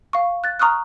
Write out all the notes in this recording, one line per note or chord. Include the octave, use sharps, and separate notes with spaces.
F5 C#6
F#6 A6
A#5 C#6 D#6 F6 F#6